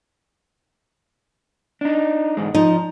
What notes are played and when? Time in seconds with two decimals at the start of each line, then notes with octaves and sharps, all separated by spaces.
1.81 D4 D#4
2.37 E2 G#2 G#3
2.55 F3 D#4